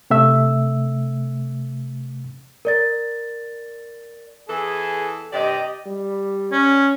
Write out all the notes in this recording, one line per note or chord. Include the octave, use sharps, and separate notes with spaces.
C3 A3 E5 E6
A#4 D5 A6
E2 E3 G#4 A4
G2 C3 G4 D5 D#5
G3
C#4